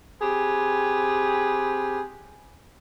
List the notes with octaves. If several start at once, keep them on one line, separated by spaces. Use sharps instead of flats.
C4 G4 G#4 B4